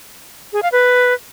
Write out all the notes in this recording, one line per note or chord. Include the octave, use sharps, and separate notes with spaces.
G#4
F5
B4